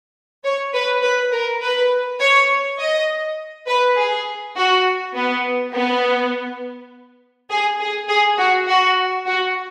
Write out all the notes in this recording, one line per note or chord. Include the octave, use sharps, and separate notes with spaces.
C#5
B4
B4
A#4
B4
C#5
D#5
B4
G#4
F#4
B3
B3
G#4
G#4
G#4
F#4
F#4
F#4